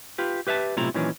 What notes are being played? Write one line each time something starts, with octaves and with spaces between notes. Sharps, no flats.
F4 G4 B4
G4 B4 E5 F5 A5
B1 A2 C3 E4 F4 A#5
A#2 D#3 E3 F#3 C#4 D4